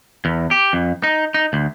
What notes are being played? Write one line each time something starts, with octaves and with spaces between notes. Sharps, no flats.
E2
G4
F2
D#4
D#4
D2